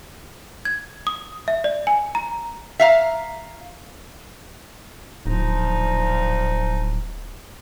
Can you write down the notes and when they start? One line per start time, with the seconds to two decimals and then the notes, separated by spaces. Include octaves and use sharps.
0.65 G#6
1.07 D#6
1.48 E5
1.64 D5
1.87 G#5
2.15 A#5
2.80 E5 F5 A#5
5.26 D1 A#2 F3 D#4